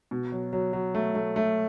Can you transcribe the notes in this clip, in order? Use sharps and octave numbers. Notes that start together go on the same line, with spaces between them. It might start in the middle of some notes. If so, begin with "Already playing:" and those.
B2
F#3
F#3
F#3
A3
A3
A3